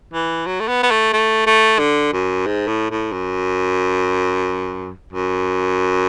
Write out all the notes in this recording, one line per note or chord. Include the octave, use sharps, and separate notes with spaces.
E3
F#3
A3
B3
B3
A3
A3
A3
D3
F#2
G#2
A2
A2
F#2
F#2